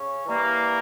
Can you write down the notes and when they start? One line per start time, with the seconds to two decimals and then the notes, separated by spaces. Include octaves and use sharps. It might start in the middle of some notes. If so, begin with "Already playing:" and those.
Already playing: C#3 C#4
0.25 E3 G3 A#3